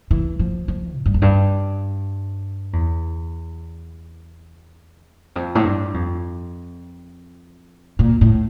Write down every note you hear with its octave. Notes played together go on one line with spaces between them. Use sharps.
E3
F3
F3
A2
G2
F2
G2
E2
F2
A2
G2
F2
A#2
A2